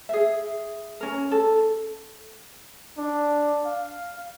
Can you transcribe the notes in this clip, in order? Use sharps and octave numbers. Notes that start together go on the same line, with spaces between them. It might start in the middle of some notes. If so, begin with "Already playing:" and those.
G#4 E5
C#4 A#4
A4
D4
F5